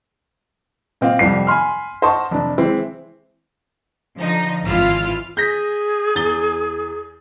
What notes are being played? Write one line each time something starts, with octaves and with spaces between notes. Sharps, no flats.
A#2 C4 D#5 F5
C2 F2 G3 C4 C7
G#5 B5 C6 F6
C5 D#5 F#5 A5 C6 C#6
F1 D4
E3 G#3 C4 E4
D3 F3 D#4
G#1 E3 E4 F4 F5 F6
G#4 G6 A#6 B6
E2 A6 G7